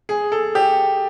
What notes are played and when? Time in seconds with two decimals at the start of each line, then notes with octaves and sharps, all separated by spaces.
0.09 G#4
0.32 A4
0.55 G4